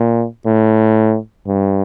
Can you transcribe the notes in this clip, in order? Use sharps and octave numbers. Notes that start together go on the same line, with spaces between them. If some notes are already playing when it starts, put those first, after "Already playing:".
Already playing: A#2
A2
G2